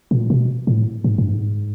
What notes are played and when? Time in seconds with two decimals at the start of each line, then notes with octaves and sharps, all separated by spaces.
0.11 A#2
0.30 B2
0.67 A2
1.04 G#2
1.18 G2
1.32 G#2